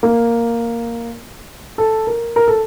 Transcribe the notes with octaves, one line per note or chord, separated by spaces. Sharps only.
A#3
A4
A#4
A#4
A4